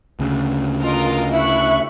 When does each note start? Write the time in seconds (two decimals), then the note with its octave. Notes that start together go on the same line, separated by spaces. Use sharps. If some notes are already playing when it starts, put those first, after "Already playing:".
0.19 D2 C#3
0.82 F4 A#4 D#5
1.32 E4 E5 C#6 F#6